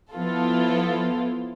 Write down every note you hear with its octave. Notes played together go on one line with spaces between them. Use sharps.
F3 B3 E4 F4 A4